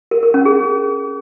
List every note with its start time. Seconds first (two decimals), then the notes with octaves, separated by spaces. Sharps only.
0.11 A#4
0.23 A#4
0.34 C#4
0.45 G#4